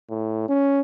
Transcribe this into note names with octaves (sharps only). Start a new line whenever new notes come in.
A2
C#4